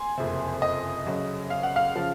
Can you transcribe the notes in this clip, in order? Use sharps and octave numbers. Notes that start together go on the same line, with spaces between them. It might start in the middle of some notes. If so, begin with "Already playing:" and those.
Already playing: G#5 C6
F#1 F2 C3
D#5
F#2 C#3 F#3
F5
F#5
F5
C#3 F3